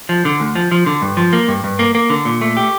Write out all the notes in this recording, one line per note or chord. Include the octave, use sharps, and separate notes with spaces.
F3
D3
D2
F3
F3
D3
G2
F3
A#3
G2
G2
A#3
A#3
D3
A#2
A3
G4